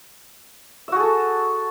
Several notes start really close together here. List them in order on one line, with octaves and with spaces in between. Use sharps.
E5 F#4 G#4 A4